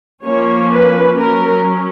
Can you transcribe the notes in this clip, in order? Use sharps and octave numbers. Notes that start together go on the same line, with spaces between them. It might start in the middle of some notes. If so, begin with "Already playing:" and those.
F3 A#3 C#4 C#5
B4
F#3 C#4 A#4